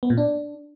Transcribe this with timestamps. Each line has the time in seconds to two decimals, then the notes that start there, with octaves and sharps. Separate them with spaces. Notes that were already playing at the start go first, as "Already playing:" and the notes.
0.03 B3
0.10 A#2
0.18 D4